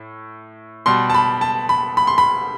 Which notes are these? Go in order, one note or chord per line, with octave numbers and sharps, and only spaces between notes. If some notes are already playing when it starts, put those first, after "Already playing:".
Already playing: A2
B2 G3 C6
A5
B5
A5
B5
B5
C6
B5